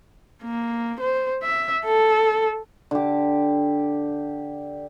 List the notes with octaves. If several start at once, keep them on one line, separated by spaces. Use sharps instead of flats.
A#3
C5
E5
A4
D3 G4